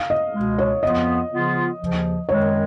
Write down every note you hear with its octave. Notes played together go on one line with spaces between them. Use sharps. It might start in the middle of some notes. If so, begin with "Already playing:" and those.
Already playing: F5
D#5
C#2 B2 G#3
C#5
F2 F3 B3 F4 D#5
C#3 F3 B3 F4
D#2 C#3 F3
F#2 D#3 G#3 C#5